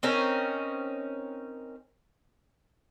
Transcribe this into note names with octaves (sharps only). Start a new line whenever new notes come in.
C4 C#4 D#4 A#4